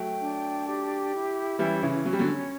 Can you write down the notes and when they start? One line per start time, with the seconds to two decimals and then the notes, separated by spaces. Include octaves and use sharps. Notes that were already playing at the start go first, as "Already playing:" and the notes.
Already playing: F#3 A3 G5
0.21 D4
0.67 G4
1.14 E4
1.59 E3 G3 C#4
1.82 C#3 E3
2.05 F#3 C#4
2.13 G3
2.19 D3 F#3